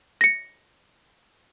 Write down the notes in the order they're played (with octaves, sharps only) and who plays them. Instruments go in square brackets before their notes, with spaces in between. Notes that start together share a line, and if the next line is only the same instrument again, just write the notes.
[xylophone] A#6 C#7